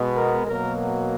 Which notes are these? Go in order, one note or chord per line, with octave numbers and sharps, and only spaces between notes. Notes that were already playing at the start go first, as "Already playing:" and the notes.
Already playing: B2 G#3 B3
A#4
B2 F#3 A#3 A#4